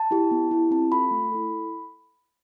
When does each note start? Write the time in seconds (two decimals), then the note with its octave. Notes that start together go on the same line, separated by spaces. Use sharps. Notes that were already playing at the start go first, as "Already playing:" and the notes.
Already playing: A5
0.11 E4 G4
0.31 B3
0.51 E4 G4
0.71 C4 A5
0.92 F4 A4 B5
1.11 A3
1.32 E4 A4